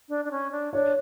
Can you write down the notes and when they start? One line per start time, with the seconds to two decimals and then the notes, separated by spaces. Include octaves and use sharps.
0.09 D4
0.25 D4
0.31 C#4
0.51 D4
0.73 D4 C#5